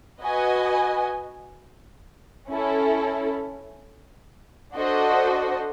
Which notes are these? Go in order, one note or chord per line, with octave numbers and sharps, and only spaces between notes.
F#4 B4 D#5 G#5
C#4 E4 A4
D4 F#4 A4 C5 D#5